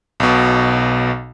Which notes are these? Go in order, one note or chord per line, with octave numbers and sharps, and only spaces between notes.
B1 B2